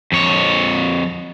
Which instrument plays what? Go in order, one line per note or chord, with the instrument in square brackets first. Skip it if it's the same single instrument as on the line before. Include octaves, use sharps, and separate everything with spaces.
[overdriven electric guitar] F2 C#5